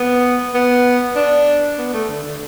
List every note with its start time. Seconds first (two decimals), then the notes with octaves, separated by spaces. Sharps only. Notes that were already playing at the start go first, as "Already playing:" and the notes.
Already playing: B3
0.54 B3
1.16 D4
1.78 B3
1.93 A3
2.09 D3
2.24 D3